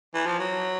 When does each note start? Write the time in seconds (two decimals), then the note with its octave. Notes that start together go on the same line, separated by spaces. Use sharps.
0.14 E3
0.26 F3
0.39 F#3